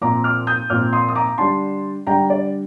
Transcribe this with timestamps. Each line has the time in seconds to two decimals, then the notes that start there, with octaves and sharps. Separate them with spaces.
0.01 A#2 F3 C4 A#5 D6
0.24 D6 F6
0.47 D#6 G6
0.70 A#2 F3 C4 D6 F6
0.93 C6 D#6
1.08 D#6
1.15 A#5 D6
1.38 D3 G3 D4 A5 C6
2.07 D3 G3 D4 G5 A#5
2.30 D5